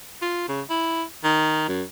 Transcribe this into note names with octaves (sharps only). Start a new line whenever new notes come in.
F4
C#3
E4
D#3
F#2